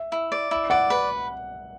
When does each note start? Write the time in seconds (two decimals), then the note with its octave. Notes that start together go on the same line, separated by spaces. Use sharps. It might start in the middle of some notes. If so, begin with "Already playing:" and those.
Already playing: E5
0.12 E4
0.32 D5
0.51 E4
0.70 D5 F#5
0.90 B4